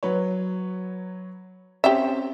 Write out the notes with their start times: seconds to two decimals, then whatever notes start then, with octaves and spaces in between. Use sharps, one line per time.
0.03 F#3 B4 C#5
1.84 C4 C#4 G4 E5